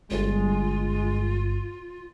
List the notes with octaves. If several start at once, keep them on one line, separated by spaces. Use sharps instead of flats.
G1 G#3 F4